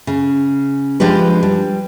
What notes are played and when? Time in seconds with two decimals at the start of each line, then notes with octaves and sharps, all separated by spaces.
0.07 C#3
1.00 F3 G#3 D4 G4 B4
1.43 G3